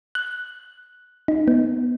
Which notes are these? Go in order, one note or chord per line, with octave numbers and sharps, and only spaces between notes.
F#6
D#4
B3